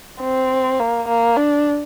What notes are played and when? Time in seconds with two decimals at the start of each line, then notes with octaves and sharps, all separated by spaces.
0.21 C4
0.79 A#3
1.08 A#3
1.37 D4